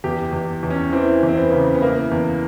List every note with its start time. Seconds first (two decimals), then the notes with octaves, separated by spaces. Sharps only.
0.04 E2 G4
0.33 E2
0.63 E2
0.70 C#4
0.92 E3 C4
1.23 E2
1.28 C4
1.37 B3
1.52 C#3
1.75 B3
1.82 E3 A#3
2.12 E2